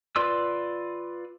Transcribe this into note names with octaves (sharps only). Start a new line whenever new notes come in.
F4 B4 D5 C6 E6